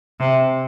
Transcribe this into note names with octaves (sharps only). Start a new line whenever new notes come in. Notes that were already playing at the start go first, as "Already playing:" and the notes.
C3